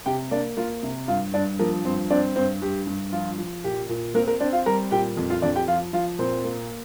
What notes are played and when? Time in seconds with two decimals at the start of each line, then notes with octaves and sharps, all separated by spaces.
0.06 C3 G4 G5
0.31 A#3 D4 D5
0.57 A#3 F4 F5
0.83 C3
1.08 G2 F4 F5
1.34 G2 D4 D5
1.59 F3 A#3 A#4
1.85 G2 C4 C5
2.10 C4 D4 D5
2.36 G2 C4 C5
2.61 G2 G4
2.87 G2
3.13 F3 F4
3.38 F3
3.64 A#2 G4
3.89 A#2
4.14 A#3 C4 A#4
4.27 A#3 A#4
4.40 C4 D4 D5
4.53 F4 F5
4.66 G3 A#4 A#5
4.91 A#2 G4 G5
5.17 F2
5.30 F4 F5
5.42 F2 D4 D5
5.56 G4 G5
5.68 F3 F4 F5
5.93 F3 F4 F5
6.19 A#2 C4 C5
6.44 A#3